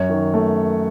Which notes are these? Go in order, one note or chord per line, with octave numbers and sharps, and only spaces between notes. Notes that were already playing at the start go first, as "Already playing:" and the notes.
Already playing: F#2 C#5
D#3
A3